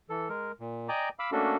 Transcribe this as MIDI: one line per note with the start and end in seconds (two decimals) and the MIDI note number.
0.10 0.29 52
0.10 0.29 69
0.29 0.52 56
0.29 0.52 70
0.60 0.88 46
0.89 1.09 74
0.89 1.09 75
0.89 1.09 79
0.89 1.09 80
0.89 1.09 82
0.89 1.09 86
1.19 1.30 77
1.19 1.30 83
1.19 1.30 86
1.19 1.30 88
1.32 1.57 57
1.32 1.57 58
1.32 1.57 61
1.32 1.57 62
1.32 1.57 66
1.32 1.57 69